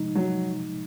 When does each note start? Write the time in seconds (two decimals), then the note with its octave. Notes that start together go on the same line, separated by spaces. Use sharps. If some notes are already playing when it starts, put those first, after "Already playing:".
Already playing: C3 F3 G#3 D#4
0.15 F#3